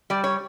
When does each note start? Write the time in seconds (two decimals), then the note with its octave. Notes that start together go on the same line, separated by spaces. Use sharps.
0.10 G3 D5
0.24 C#5